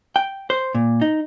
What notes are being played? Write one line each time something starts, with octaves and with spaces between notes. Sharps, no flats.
G5
C5
A#2
D#4